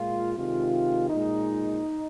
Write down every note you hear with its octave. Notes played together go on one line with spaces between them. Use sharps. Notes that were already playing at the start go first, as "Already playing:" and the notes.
Already playing: A#2 G#3 F4
C3 D#3 G#3 F4
A#2 G#3 D#4